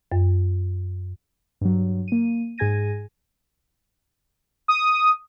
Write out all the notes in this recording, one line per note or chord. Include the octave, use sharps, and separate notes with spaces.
F#2
G2 F#3
A#3 D#7
G#2 G#4 G#5 G#6 A#6 D#7
D#6